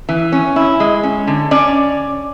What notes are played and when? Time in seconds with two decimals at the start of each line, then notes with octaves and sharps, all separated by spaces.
0.09 E3
0.32 C#4
0.56 E4
0.80 G#3
1.03 C#4
1.27 D3
1.51 C#4 D5